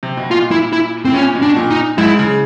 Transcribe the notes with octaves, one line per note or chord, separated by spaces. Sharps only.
C3
B2
A#2 F4
E4
E4
A2 C4
A#2 C#4
B2
D4
A#2
D#4
G#2 E4
C#3